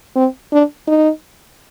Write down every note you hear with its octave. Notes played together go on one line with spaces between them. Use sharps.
C4
D4
D#4